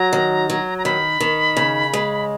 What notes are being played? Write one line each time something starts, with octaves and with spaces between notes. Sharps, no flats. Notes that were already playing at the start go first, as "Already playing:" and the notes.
Already playing: F#3 A#5
D#3
F#3
A#5
D#3 B5
D#3
C#3
G#3